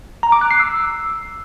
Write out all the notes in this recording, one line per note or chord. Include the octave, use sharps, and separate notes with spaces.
A#5
D6
F#6
C7
E6